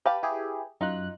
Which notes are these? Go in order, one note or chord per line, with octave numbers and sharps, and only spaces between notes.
G4 B4 F5 A5
E4 G4 G#4
F#2 D#4 F4 F#6